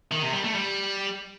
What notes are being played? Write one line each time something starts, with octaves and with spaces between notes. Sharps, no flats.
D#3
C3
G3
A3
G3